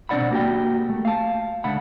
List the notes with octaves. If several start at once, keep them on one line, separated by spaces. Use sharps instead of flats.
B2 C4 D4 D5 F#5 B5
A#3 F#4 G4 G5
A3
F5 A5
C#2 D3 A3 D4 F#5 B5